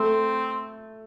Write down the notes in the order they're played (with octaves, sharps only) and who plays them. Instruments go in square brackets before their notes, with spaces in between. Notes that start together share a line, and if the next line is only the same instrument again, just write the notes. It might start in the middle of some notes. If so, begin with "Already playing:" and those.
Already playing: [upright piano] A3 [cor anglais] C4